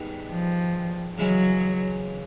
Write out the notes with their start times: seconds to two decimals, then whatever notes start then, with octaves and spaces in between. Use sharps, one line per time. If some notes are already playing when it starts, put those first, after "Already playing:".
Already playing: G#2 D#3 G3 B3 D4
0.31 F3
1.18 C#3 E3 F#3 G#3 C#4 E4